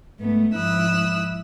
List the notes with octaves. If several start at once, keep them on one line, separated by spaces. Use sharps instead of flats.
G#2 A3 B3
G#2 F3 E4 D#6 E6 F#6